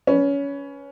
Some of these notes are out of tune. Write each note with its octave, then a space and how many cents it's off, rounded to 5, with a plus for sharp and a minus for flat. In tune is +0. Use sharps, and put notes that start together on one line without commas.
C#4 +20 B4 +0